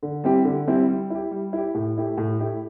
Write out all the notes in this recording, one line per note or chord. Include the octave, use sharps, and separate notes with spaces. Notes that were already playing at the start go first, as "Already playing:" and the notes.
D3
G3 C4 E4 G4
D3
G3 C4 E4 G4
G3
E4 G4
G3
E4 G4
A2
A3 E4 G4
A2
A3 E4 G4